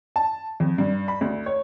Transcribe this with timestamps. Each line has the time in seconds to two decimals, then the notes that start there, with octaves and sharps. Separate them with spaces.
0.16 A5
0.60 F2
0.78 G2
1.08 B5
1.21 D2
1.46 C#5